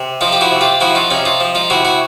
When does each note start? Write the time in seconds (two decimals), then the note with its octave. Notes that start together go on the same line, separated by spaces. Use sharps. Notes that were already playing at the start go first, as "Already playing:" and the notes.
Already playing: C3
0.21 F3 D#4 F4
0.33 G4
0.41 E4 F#4
0.51 C3
0.61 F4 G4
0.81 F3 E4 F#4
0.95 D#4 F4
1.11 C3 C#4 D#4
1.25 D#4 F4
1.40 F3
1.55 D#4 F4
1.70 C3 E4 F#4
1.85 E4 F#4